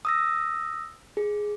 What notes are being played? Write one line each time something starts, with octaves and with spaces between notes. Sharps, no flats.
D#6 E6 A#6
G#4